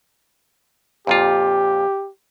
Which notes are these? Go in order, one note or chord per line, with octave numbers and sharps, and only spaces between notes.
F2 A#2 F4 G4